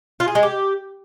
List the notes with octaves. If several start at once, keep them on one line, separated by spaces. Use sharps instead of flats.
F4
G#4
G#3
G4